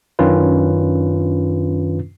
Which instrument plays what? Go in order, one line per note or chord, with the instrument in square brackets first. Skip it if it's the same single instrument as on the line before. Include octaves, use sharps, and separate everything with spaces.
[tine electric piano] F#2 D#3 C#4 D4 F4 B4